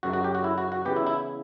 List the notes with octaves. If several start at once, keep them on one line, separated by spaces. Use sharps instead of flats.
F#2 C#3 F#3 A3 F#4
F#4
G4
F#4
E4
F#4
F#4
C#3 E3 B3 G4
E4
E4